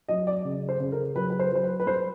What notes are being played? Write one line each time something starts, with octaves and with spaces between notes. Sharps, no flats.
F#3 D#5
D5
C#3
C5
C#3
A#4
F#3 B4
B4
C5
F#3 C5
B4
B4
G3 C5